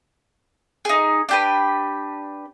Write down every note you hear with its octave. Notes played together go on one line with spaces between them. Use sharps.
D#4 G#4
D4 G4 B4